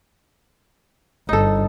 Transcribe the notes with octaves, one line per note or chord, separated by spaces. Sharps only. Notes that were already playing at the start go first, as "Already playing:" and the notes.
G1 D#4 A4